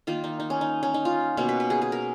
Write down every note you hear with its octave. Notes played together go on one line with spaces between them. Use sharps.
D#3 A#3 F4
D#4
D#4
C#4
D#4
C#4
D#4
F4
B2 A#3 C#4
B4
B4
G#4
G#4
A#4